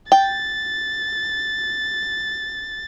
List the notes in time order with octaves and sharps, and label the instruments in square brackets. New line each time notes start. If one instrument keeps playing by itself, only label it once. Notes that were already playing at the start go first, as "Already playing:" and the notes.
[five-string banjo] G5 [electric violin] A6